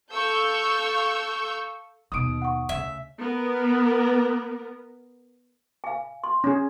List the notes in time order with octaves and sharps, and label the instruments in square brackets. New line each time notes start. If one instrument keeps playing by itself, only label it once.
[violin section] A4 F5 C#6 E6 G6
[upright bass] D#2 B2 [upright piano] D#6 D7
[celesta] F#5 C#6
[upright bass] D2 C#3 [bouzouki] E5
[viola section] B3 A#4
[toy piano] F5 G#5
C6
[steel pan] C#4 G#4